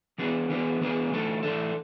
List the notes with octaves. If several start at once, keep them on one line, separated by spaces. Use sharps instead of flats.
E3 B3 D4 G#4 B4
E3 B3 D4 G#4 B4
E3 B3 D4 G#4 B4
E3 A3 D4 A4
E3 A3 D4 A4